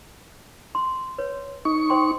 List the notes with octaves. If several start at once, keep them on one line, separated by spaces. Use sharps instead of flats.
C6
B4 C#5
D#4 C#6
C5 G5 C6